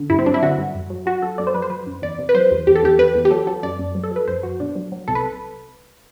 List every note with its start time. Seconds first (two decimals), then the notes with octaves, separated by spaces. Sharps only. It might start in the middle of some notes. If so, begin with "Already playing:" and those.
Already playing: D3
0.10 G2 E4
0.19 C4
0.26 F#3 D4
0.34 E4
0.42 D3 F#4
0.58 G2
0.75 F#2
0.90 F#3
1.06 F#3 F#4
1.22 F#3 A4
1.38 F#2 D5
1.47 C5
1.54 F#2 B4
1.62 C5
1.70 F#3 B4
1.87 F#2
2.02 E2 D5
2.19 C3
2.29 B4
2.35 F#3 C5
2.51 E2
2.67 E2 G4
2.75 A4
2.83 E2 G4
2.99 E2 B4
3.15 E2
3.25 G4
3.31 F#3 A4
3.47 F#3 A4
3.63 F#2 D5
3.79 F#2
3.95 F#3
4.04 A4
4.11 F#3
4.16 B4
4.28 F#2 C5
4.43 F#2 F#4
4.60 B2 D4
4.75 F#3
4.92 F#3
5.08 C2 A4
5.15 B4